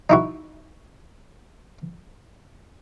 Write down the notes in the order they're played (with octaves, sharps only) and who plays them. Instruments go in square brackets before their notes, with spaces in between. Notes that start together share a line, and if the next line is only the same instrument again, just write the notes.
[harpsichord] D#4 E4 F#4